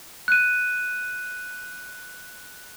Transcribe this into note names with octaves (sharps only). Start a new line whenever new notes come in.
F#6 D#7